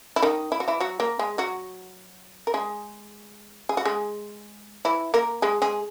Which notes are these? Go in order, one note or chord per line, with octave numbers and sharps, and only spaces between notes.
E4
D#3 D#4
E4
F#4
E3 E4
F#3 F#4
A#3 A#4
G#3 G#4
F#3 F#4
A#4
G#3 G#4
G#4
F#4
G#3 G#4
E3 E4
A#3 A#4
G#3 G#4
G#3 G#4